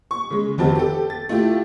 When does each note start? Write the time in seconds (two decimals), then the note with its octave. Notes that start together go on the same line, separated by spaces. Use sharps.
0.11 C#6
0.30 C#3 G#3
0.58 F1 D#3 C4 F#4 G4 A5
0.75 G4 A4
1.10 A6
1.29 A3 E4 F4 G4